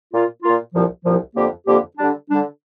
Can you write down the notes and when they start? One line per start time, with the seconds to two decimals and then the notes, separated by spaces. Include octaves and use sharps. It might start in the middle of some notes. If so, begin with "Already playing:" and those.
0.11 A#2 A#3 F4
0.43 A#2 A#3 F4
0.73 C2 A#2 F3
1.04 C2 A#2 F3
1.35 F2 D3 A#3 G4
1.65 F2 D3 A#3 G4
1.97 D3 G3 D4
2.28 D3 G3 D4